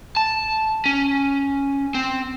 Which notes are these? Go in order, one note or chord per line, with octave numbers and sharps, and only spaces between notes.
A5
C#4
C4